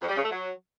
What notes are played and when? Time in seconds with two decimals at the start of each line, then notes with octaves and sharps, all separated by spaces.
0.01 F2
0.09 G3
0.16 C#3
0.23 A3
0.31 F#3